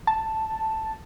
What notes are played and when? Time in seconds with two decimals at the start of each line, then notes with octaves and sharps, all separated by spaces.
0.07 A5